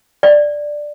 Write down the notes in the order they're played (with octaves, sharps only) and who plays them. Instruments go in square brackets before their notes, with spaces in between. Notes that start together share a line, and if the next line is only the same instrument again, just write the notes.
[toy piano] D5